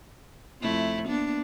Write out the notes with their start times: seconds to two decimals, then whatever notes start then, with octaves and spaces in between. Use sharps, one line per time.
0.61 F2 A3 E4
1.08 A#3 B3 D4